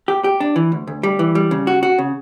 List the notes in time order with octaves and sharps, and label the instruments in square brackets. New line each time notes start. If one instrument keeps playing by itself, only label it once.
[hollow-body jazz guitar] G4
G4
D4
E3
D2
D2
G3
E3
G3
C#3
F#4
F#4
C#3